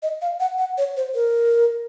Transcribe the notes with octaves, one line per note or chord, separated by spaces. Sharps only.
D#5
F5
F#5
F#5
C#5
C5
A#4